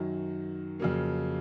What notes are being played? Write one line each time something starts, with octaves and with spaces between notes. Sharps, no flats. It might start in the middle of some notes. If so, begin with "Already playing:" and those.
Already playing: F#2 D#3 F#3
F2 C#3 F#3 A#3